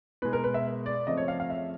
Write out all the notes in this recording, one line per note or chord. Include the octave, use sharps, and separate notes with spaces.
B2 G#3 B4
A#4
B4
E5
D5
F2 C#3 F3 A3 D#5
C#5
F5
F5
E5